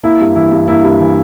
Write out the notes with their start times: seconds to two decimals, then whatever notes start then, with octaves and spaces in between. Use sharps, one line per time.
0.03 A#3 E4
0.20 G2
0.35 E3 E4
0.52 G2
0.68 A#3 E4
0.84 G2
1.00 E3